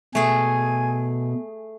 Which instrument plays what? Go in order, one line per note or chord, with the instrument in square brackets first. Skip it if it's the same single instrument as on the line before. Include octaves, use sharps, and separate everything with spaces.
[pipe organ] B2 [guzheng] A3 G#4 [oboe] G#5